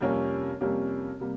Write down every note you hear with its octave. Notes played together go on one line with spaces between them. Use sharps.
F2 C3 G3 A#3 C#4
F2 C3 G3 A#3 C#4
C3 G3 A#3